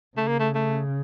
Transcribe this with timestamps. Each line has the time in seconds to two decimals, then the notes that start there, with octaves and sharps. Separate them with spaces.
0.17 C#3 A3
0.28 A#3
0.40 A3
0.55 A3